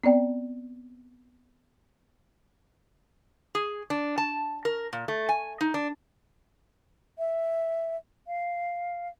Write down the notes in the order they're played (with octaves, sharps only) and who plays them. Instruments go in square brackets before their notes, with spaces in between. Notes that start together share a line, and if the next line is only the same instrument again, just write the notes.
[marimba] B3 C4 D5 G5
[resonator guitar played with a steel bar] G#4
D4
A5
A#4
A#2
A3
G#5
D#4
D4
[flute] E5
F5